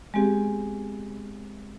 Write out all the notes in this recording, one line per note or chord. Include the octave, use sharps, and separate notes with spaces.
G#3 B3 C4 G4 G#4